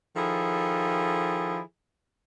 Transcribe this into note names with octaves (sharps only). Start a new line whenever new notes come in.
D#3 F3 E4 G#4 A4